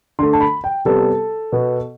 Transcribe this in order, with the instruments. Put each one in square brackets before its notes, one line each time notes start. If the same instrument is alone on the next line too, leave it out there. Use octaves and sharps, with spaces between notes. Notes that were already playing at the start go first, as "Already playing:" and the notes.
[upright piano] D3 A3 C6
A5
B5
G5
C3 G3 B3 A4
B2 B3